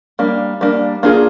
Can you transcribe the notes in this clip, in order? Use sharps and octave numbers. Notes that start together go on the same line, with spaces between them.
G3 A#3 D4
G3 A#3 D4
A#3 D4 F4 G#4